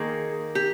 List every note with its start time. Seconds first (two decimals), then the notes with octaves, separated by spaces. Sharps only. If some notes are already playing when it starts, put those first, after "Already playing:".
Already playing: D#3 A#3 G#4
0.55 G4